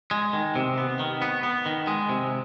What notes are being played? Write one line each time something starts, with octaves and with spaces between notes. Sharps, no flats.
G#3
D#3
C3
B3
D#3
B3
B3
D#3
G#3
C3